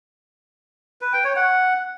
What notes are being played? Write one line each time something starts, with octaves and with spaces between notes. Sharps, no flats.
B4
G5
C#5
F#5